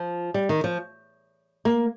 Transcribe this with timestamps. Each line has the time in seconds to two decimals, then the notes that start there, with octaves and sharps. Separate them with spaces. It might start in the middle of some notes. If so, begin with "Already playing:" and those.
Already playing: F3
0.34 G3
0.49 D#3
0.64 F3
1.65 A#3